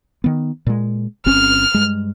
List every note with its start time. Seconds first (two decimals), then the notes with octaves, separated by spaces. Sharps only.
0.24 D#3 B3
0.67 A#2 G#3
1.26 G1 C4 C#4 F6
1.74 G2 G#3